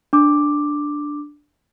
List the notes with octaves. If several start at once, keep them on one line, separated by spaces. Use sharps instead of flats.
D4 D6